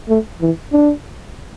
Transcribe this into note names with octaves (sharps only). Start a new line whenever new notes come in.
A3
E3
D4